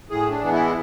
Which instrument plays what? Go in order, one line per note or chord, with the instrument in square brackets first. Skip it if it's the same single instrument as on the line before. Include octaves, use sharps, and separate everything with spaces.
[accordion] A2 G#4
D4
E3 G#3 B3
E4